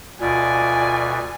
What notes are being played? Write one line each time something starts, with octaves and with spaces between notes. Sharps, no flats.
D2 B2 F4 D5 G#5